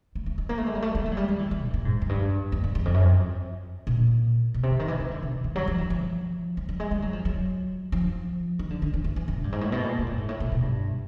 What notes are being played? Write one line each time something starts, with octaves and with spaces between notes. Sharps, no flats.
A3
A3
G#3
A#3
A3
G#3
G3
A3
A#3
A3
F#3
G3
F#3
E3
E3
A#2
A#2
G#2
F#2
G2
E2
F2
E2
F2
F#2
F2
A#2
B2
C3
D3
D#3
E3
E3
D3
B2
D#3
F#3
F3
E3
F3
F#3
G3
G#3
G3
F#3
F3
F#3
F3
D#3
D3
D3
E3
E3
E3
D3
G#2
G2
G#2
A2
B2
A#2
A#2
A2
G#2
A2
A#2
B2
G2